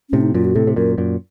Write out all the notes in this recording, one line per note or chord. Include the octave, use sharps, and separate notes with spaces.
A2 C3 C#4
D#4
F#2 A#2 F4
F#4
A2 C3 A4
C3
F#2 A#2 A#4
F#2 A#2